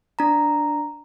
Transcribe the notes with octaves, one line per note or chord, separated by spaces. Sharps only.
D4 A#5